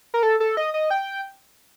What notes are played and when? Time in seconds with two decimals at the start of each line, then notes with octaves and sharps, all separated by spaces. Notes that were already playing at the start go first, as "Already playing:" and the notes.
0.14 A#4
0.23 A4
0.40 A4
0.57 D#5
0.74 D#5
0.90 G5